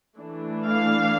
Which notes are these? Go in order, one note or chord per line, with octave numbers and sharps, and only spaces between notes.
E3 A3 D4
F5